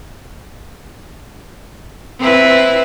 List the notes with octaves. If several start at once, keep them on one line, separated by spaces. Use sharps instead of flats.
C4 E4 B4